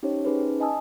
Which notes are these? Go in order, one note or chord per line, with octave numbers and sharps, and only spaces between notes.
C#4 D#4 G4 C5 C#5
C#4 D#4 G#4 B4 C5
D#5 G#5 A5 D#6 E6